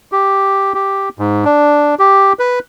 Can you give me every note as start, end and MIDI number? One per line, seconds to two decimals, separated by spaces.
0.12 0.73 67
0.74 1.09 67
1.19 1.44 44
1.45 1.95 62
1.99 2.33 67
2.39 2.59 71